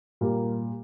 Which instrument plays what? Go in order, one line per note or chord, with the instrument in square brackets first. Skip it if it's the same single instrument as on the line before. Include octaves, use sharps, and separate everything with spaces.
[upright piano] A#2 G3 A#3 A#4